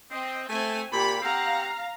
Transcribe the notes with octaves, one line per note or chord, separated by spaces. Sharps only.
C4 D#5
A3 C4 G#5
A#2 G4 B5
C4 G4 F5 F#5 A#5